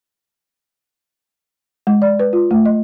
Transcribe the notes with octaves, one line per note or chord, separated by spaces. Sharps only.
G#3
D5
B4
F4
A3
D#5